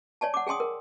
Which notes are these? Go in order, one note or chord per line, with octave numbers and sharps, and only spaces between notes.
C#5 D5 G#5 A5
F#5 D6
G#4 G5 G#5 C6 D#6
A#4